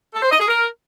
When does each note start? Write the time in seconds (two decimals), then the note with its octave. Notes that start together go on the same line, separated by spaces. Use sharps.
0.14 A4
0.23 C5
0.31 D#5
0.39 G#4
0.48 A#4